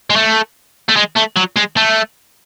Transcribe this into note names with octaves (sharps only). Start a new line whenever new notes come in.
G#3
A3
A3
G#3
A3
F#3
G#3
A3